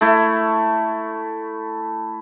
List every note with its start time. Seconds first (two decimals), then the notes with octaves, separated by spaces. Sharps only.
0.01 A3 E4